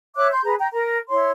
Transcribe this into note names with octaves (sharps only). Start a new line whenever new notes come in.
C#5 E5 D6 F#6
C6 G6
G#4 B4 A#5
G5 A#5
A#4 A#5
E4 C#5 C6